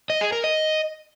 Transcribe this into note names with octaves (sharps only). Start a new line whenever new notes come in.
D#5
G#4
A#4
D#5